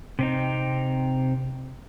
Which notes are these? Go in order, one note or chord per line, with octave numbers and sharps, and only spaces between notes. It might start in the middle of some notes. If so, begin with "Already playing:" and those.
C3 C4 D#4